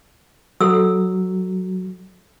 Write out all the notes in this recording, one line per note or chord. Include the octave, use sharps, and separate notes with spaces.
F#3 A4 E6